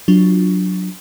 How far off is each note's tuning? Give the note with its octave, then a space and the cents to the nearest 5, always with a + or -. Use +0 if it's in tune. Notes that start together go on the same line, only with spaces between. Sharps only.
F#3 -5 D4 +0 F4 +0